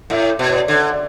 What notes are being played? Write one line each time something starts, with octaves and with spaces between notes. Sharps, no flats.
A2 E5
B2
C#5
D5
D3
D5